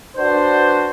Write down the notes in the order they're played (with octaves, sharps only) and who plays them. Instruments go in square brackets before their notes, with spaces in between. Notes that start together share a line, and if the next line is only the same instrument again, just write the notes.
[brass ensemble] D4 F#4 B4 C5